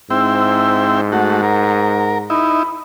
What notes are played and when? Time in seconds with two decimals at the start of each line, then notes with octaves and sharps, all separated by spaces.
0.10 G#2 C4 E4 G5 E6
1.12 A3 F#4 F#5
1.43 A#4
2.30 D#4 E4 B5